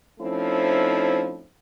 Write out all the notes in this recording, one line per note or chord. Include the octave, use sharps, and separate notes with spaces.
F3 A3 C4 C#4 D#4 E4